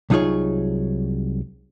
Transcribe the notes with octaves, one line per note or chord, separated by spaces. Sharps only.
C2 F#3 D#4 F4 G#4 C#5